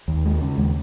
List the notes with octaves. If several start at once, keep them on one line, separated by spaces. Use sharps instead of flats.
D#2
G#3
C#3
D#2